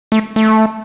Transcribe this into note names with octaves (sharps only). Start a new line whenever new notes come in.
A3
A3